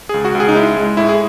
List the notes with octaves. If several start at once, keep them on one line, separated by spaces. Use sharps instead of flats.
C#2 G#4
F#4
C#2
G#4
D#4
G#3 E4
G#3
A2 E4
G#4